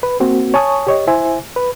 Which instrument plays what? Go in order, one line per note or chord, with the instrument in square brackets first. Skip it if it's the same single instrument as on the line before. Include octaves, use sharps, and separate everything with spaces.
[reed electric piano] B4
A#3 C4 F#4
C#5 G#5 A5 C#6 D#6
G4 C#5 D#5
E4 C5 E5 G#5
B4